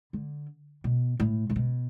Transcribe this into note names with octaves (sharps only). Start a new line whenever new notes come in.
D3
B2
A2
A2
B2